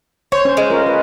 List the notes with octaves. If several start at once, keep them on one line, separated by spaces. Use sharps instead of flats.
C5 C#5
C#4 C5
G#3
F4 A#4
B4